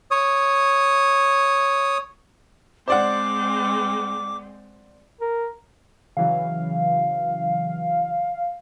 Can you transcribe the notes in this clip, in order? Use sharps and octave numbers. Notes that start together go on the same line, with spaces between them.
C#5 D#6
G#3 C4 C5 D5 F#5 D6
A#4
C#3 E3 F#3 F5